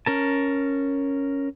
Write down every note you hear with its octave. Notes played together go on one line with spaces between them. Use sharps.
C#4 A#4 A5